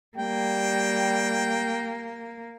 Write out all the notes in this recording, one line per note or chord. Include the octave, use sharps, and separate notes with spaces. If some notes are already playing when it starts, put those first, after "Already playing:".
G3 A#3 G5